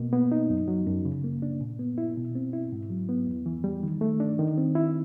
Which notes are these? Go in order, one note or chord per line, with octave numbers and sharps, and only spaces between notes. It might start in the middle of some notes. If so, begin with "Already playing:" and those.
Already playing: B2 A#3
B3
D#4
F#2
F#3
F#2
C#3
A#3
D4
A#2
B3
E4
B2
C4
E4
G#2
F#3
B3
E2
E3
G3
D#3
A3
D4
D#3
C4
E4